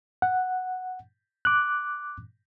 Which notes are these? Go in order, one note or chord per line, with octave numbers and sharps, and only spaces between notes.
F#5
D6 F#6